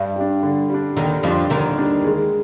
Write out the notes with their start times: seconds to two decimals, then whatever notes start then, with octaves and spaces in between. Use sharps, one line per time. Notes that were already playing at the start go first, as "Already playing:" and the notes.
Already playing: G2
0.16 G3 D4
0.43 D3
0.70 G3 D4
0.97 D#2 D3 D#3
1.23 F2 F3 G3 D4
1.50 D#2 D3 D#3
1.78 G3 D4
2.05 G#3